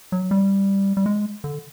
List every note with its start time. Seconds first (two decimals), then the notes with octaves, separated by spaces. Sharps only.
0.12 F#3
0.31 G3
0.97 G3
1.06 G#3
1.44 D3